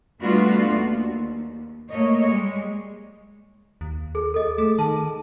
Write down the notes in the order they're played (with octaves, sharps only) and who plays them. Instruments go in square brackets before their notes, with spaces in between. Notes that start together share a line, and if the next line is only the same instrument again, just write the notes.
[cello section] G3 A3 B3 D4 F4 F#4
D#2
A3 A#3 C#5 D#5
G3 G#3
[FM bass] D#2
[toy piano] G#4
A4 D#5
[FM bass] A3 [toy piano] G#4
[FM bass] D#3 [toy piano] A5